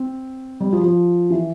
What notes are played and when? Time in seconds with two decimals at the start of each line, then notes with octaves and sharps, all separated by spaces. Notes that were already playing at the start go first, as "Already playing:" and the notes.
Already playing: C4
0.60 G3
0.73 F3
0.84 F3
1.30 E3